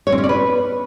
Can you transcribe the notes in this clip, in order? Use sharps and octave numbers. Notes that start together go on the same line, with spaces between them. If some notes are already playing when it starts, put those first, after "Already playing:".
C#5
C4
C#4
D5
B4